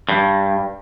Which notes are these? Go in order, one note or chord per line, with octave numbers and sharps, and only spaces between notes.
G2